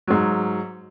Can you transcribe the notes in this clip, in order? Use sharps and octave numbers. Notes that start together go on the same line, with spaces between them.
G#2 F#3